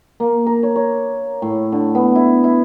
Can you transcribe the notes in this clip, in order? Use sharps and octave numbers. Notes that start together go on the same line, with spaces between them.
A#3
A#4
C#5
C#5
A2
D3
B3
E4
E4